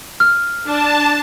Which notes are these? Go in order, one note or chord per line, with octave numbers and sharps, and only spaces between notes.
F6
D4 A5